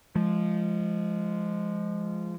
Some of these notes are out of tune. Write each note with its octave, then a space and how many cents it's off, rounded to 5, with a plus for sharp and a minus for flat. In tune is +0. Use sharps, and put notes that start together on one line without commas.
F3 -15 G#3 +0